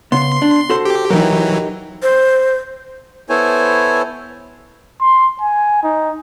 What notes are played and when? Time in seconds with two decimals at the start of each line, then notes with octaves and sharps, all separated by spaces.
0.12 C#3 B3 C6
0.42 D4
0.70 F#4 A4 C5
0.85 G4
1.10 E3 F#3 D#4 G4 A#4
2.03 C5
3.29 B3 E4 A4 C5 C#5 G#5
5.01 C6
5.41 G#5
5.83 D#4